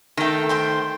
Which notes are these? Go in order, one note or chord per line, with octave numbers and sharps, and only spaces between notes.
D#3 A3 G5 A#5
C5 G5 C6